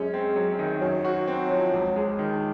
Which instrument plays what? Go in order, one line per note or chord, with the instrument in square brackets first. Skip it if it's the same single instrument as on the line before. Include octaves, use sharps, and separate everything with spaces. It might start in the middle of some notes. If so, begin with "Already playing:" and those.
Already playing: [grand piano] F#2 C#4 [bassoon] G#3
[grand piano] C4
F#3
D#3
[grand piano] F#2 [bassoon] F#3
[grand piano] F#4
C4
F3
C#2
G#3
D#3